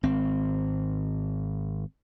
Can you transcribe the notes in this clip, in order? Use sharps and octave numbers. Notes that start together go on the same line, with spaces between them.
G#1 C4